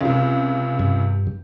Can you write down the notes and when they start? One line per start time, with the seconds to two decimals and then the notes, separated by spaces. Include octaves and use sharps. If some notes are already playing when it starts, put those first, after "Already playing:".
0.01 C#2 C3
0.79 G2